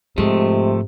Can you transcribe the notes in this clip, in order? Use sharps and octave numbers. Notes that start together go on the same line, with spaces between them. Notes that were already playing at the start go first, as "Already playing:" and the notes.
G#2 C3 F3 G#3 A3